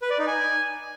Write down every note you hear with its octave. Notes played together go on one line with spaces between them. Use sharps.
B4
D5
D#4
G#5